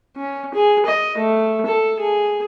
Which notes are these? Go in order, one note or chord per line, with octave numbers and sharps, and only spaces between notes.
C#4
G#4
D#5
A3
A4
G#4